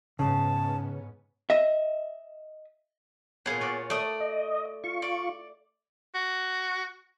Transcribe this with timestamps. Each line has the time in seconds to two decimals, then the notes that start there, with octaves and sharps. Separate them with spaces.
0.19 G#2 C#3 B3 C#4 A5
1.50 D#5 E5
3.46 A#2 B3 G#4 C#5 F5 F#5
3.61 F4 F#4 D5
3.90 A3 D5 D#6
4.20 D#5
4.84 F4 C#6
5.02 D5
6.14 F#4